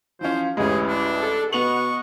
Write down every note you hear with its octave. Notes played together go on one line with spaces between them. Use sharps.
E3 F3 C#4 C5
A1 D2 E3 G#3 C#4 G4 G#4
D4
A4
B2 B3 D#5 F#5 C#6 F7 F#7